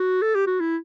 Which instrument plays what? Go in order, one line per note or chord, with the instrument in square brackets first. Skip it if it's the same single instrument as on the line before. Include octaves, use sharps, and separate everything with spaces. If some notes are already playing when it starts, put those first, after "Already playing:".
Already playing: [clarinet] F#4
A4
G4
F#4
E4